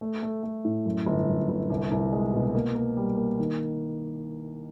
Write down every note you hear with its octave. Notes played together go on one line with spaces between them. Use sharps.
A3
A3
A3
A2
F#2
G1
F#2
G1
C2
C2
G#3
B2
A#3
A#3
G3
A#3
D#3